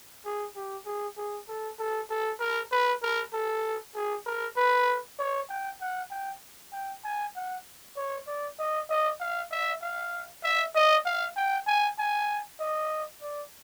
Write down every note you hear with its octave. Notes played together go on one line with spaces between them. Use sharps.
G#4
G4
G#4
G#4
A4
A4
A4
A#4
B4
A#4
A4
G#4
A#4
B4
C#5
G5
F#5
G5
G5
G#5
F#5
C#5
D5
D#5
D#5
F5
E5
F5
E5
D#5
F5
G5
G#5
G#5
D#5
D5